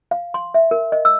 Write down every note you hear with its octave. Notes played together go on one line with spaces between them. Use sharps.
F5
C6
E5
A#4
D#5
E6